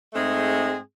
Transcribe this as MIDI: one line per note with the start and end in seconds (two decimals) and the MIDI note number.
0.14 0.77 44
0.14 0.77 56
0.14 0.77 57
0.14 0.77 60
0.14 0.77 68